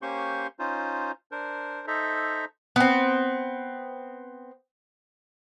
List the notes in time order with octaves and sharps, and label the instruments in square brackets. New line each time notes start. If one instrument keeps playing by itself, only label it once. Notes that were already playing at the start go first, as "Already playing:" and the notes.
[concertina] A#3 C#4 G4 C5 C6 C#6
C#4 D#4 F4 C5
D4 A#4 C5
D#4 A4 C5 E5 A#5
[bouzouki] B3 C4